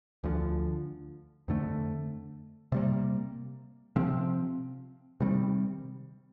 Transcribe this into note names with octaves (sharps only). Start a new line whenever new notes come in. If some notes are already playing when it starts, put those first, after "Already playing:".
D2 D3 F3
F2 D3 A3
C3 G3 A#3
C3 F3 C4
C3 D#3 G3 C4